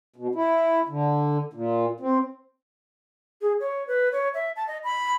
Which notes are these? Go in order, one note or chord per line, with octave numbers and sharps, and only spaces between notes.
B2
E4
D3
A#2
C4
G#4
C#5
B4
C#5
E5
A5
D#5
B5